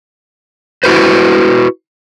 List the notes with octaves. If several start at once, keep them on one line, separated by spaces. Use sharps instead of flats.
E4 F#4 B4 C5